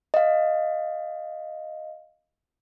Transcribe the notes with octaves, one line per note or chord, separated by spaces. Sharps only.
D#5 F5